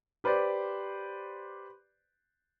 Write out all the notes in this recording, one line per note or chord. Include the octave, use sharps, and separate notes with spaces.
G4 B4 C5 D5